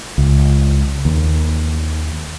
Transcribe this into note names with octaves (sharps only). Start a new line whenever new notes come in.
C#2
D#2